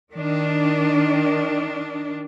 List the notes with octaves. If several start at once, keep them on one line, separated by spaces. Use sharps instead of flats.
D#3 D4